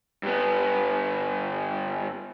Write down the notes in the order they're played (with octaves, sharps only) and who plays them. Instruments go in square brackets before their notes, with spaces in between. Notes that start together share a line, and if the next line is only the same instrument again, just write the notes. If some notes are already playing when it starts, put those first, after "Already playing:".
[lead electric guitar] G2 B3